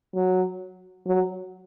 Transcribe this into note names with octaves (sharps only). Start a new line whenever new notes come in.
F#3
F#3